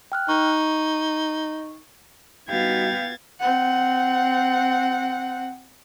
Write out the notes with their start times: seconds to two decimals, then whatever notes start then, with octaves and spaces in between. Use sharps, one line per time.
0.12 G5 F6 F#6
0.29 D#4 C#6
2.49 G3 B3 D#4 F#4 F5 G5 G#6 A6
3.41 C4 F#5